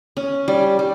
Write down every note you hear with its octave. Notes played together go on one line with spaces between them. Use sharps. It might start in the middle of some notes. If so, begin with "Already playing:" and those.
C#4
G3
G3